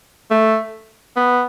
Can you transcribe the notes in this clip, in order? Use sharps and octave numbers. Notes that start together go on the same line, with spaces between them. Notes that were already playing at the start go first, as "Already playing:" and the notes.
A3
B3